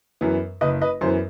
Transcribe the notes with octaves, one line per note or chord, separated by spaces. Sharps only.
F#2 E3 B3
F#1 B4 D#5
B4 D#5
F#2 E3 B3 C5